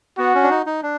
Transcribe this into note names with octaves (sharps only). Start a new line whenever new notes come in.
B3 F#4
C#4
D4
D#4
D#4
D4